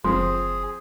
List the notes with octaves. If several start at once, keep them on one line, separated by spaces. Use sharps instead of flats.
F#1 F3 C4 G#4 C6